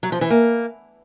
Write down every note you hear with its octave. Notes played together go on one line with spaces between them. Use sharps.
F#3
F3
E3
A#3